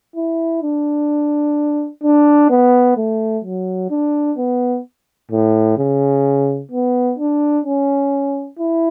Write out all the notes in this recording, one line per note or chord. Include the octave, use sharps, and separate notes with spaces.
E4
D4
D4
B3
A3
F#3
D4
B3
A2
C#3
B3
D4
C#4
E4